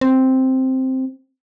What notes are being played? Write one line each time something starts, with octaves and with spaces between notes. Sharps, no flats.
C4